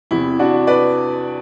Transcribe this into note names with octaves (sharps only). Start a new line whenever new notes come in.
E2 C3 E3 E4
D4 F#4
B4 D5